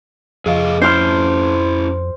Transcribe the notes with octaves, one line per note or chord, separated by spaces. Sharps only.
F2 G#4 D#5 F5
C#4 E4 C5 F6